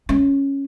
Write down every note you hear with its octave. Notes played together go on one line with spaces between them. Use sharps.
C#4